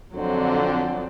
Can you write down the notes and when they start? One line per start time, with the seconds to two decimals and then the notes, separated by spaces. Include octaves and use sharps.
0.15 F2 D3 F#3 C4